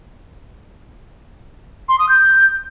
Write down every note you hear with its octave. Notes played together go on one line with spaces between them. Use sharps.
C6
D#6
G6